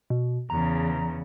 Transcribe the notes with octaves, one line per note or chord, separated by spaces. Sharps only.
B2
E2 C#3 A#5